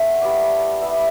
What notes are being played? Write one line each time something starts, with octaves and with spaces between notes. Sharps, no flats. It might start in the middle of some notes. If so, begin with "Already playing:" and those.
Already playing: A3 C4 E5 F#5
G3 B3 E4 D5
G3 B3 E4 E5